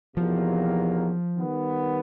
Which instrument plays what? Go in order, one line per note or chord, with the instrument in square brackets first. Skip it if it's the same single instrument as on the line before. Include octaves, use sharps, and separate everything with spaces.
[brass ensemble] E2 C3 D#3 F#3 A#3 [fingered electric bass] F3
[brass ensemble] D#3 G3 B3